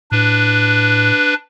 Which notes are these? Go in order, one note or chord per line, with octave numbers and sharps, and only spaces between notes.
A2 D4 B4